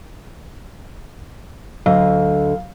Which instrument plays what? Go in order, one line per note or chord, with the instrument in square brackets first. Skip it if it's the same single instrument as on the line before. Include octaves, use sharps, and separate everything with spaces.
[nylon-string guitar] D2 D3 D#5 [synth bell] F#3 [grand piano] F5